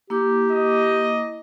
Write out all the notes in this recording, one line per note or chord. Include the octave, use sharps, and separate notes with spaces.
A#3 E4 G4 D6
D#5